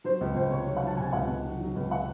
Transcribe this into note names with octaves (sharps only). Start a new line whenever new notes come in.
F#3 C5
C#2
C#2 C5
C3 C#5
F#3
F#5
F#3 A5
C3 G#5
C#2 F#5
C#2
F#3
F#3
C#2
F#5